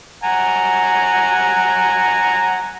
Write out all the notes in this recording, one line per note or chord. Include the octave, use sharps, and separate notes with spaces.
F#5 G#5 A#5